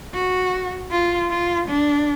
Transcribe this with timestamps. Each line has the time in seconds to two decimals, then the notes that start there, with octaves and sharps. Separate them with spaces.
0.13 F#4
0.91 F4
1.30 F4
1.69 D4